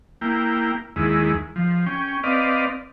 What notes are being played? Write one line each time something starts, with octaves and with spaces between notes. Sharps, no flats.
A#3 E4 G5
D#2 G#3 E4
F3
C#4 G5
C4 B4 D5 D#5 F5